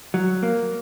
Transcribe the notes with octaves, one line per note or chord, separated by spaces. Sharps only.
F#3
A#3